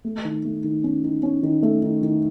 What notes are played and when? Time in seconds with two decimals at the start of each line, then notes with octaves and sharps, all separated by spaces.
0.05 A3
0.25 D#3
0.45 A3
0.64 D#3
0.84 C#4
1.04 D#3
1.23 C#4
1.43 D#3
1.63 A3
1.83 D#3
2.03 D#3